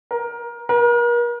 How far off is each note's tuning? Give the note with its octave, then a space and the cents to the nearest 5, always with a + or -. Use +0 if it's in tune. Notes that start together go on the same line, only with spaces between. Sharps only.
A#4 +20
A#4 +40